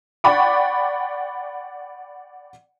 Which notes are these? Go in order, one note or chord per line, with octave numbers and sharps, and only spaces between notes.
D5 F#5 G5 B5 C#6 D6